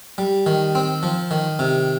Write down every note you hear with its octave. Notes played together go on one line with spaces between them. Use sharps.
G3
D#3
C4
F3
D#3
C3